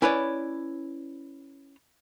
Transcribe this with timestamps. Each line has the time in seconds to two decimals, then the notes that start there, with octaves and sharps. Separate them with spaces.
0.02 C#4 E4 B4 C#5 D5